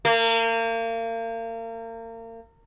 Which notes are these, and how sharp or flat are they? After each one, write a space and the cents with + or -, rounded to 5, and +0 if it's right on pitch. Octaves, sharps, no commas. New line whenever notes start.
A#3 -35